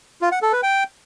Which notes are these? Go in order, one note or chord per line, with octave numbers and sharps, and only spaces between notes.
F4
F#5
A4
B4
G5